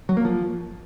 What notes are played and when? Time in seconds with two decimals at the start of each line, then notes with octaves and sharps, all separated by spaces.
0.09 F#3
0.17 A#3
0.25 F3